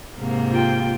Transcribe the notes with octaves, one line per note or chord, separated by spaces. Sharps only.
G#2 C3 A#3
F4 G5